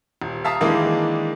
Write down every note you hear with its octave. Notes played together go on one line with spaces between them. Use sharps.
D#1
E5 F5 A5 A#5 D#6
D#3 E3 G#3 A#3 D4 E4